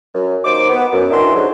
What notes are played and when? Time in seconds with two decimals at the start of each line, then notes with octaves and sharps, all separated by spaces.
0.15 F#2
0.45 D#2 A#3 D#4 C5 D6
0.70 B3
0.92 F#2
1.11 D#3 E3 D4 A#4 E5 C6
1.34 G#2 D3 F#3